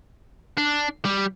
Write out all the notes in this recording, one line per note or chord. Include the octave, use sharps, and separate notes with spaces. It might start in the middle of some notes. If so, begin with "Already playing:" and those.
D4
G3